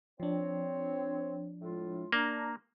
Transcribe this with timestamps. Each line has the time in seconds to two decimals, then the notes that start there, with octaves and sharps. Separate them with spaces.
0.20 F3 C4 D4 C#5
1.62 A2 G#3 F4
2.12 A#3 D4 A#5